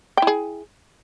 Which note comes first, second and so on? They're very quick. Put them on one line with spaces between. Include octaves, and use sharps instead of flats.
G5 E4 G#4